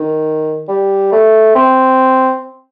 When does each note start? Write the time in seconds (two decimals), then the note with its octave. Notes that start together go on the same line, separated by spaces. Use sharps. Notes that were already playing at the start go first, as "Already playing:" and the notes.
Already playing: D#3
0.68 G3
1.12 A3
1.55 C4